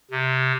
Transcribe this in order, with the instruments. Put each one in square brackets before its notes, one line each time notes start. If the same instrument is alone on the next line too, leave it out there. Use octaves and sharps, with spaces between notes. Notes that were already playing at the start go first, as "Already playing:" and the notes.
[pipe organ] C3